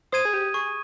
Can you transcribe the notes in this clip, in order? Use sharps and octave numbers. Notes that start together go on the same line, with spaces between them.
C5 D#6 G#6 D#7
G#4
G4
G#4 C#6